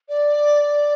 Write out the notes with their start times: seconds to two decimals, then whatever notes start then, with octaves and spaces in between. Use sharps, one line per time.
0.09 D5